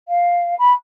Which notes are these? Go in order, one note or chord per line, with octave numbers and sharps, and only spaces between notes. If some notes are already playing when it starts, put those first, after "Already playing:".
F5
B5